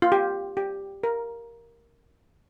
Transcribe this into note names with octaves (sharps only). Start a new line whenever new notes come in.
F4
G4
G4
A#4